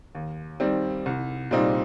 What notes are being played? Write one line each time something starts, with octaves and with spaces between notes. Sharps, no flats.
D#2
D#3 G3 C4
C2
A#2 G3 C4 D#4